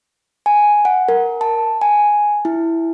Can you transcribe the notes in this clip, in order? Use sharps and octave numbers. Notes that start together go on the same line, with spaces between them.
G#5
F#5
A#4
A5
G#5
E4